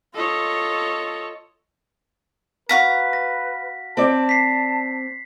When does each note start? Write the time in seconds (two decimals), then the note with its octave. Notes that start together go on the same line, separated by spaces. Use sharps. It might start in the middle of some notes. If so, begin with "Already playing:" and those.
0.15 F4 A4 C#5 D#5
2.69 F#4 B4 F5 A#5 B6
3.13 A#6
3.97 C4 D5 A5
4.29 B6 C7